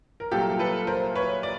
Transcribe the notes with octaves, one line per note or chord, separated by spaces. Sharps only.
A#4
C2 A#2 F#3 A#3 G4 A4
A4 B4
A#4 C5
B4 C#5
D5